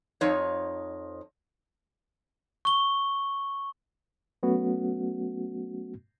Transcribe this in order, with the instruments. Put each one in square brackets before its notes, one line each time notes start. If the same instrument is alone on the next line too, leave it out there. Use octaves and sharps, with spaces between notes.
[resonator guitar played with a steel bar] F2 F3 D#4 C#5
[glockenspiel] C#6 G7
[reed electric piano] F#3 A3 B3 C#4 F#4